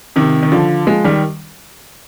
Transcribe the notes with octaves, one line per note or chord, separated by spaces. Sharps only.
C3 D#3
D#3
D3 F3
F3 G#3
D#3 G3